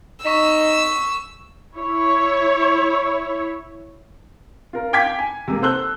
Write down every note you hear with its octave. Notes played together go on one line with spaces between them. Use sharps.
D#4 C#6 E6 B6 E7
E4 C#5
F4 A#4
F5 G5 D6 G#6 B6
G#5
C3 G#3 A#3
A4 C5 E6 F#6 G7